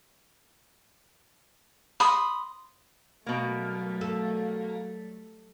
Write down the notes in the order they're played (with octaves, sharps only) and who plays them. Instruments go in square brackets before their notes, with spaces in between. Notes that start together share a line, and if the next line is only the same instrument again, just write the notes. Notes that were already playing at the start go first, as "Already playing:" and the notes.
[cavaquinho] B5 C6 D#6
[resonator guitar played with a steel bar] B2 A#3 [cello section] F#3 G3 A3
[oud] A4